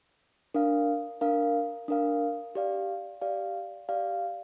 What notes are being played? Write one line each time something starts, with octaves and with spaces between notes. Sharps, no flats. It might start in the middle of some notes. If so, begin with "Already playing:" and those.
D4 A#4 F5
D4 A#4 F5
D4 A#4 F5
G4 D5 F5
G4 D5 F5
G4 D5 F5